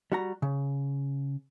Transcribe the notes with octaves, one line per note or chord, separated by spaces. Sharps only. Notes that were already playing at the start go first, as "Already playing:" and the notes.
G3 F#4 A#5
C#3